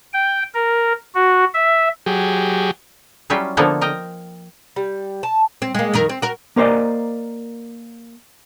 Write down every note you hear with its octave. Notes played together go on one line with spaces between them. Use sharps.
G5
A#4
F#4
E5
F#3 G4 G#4
F#3 G3 C#4 E4 F4
D3 F3 A#3 B3 E4 A4
A#4 D#5 G5
G3
A5
C4
G#3 A#3
F2 D#3 A#4
C4
F#4 A#4
A#3 A#4 C5 D5 D#5